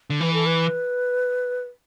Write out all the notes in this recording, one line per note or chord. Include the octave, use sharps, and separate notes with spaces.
D3
E3 B4
A4
B4